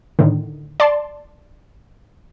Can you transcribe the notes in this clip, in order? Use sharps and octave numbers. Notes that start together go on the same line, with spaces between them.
A2 D3 D#3
D5 A5 C6